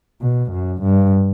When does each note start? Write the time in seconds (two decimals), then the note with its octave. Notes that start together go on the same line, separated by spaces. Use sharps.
0.21 B2
0.51 F#2
0.82 G2